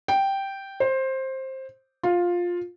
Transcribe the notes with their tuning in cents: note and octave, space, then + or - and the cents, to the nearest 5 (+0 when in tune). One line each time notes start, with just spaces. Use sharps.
G5 -5
C5 +15
F4 +10